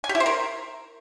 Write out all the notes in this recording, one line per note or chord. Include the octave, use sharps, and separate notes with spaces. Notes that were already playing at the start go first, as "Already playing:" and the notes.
G#5
G4
E4
C5
A#4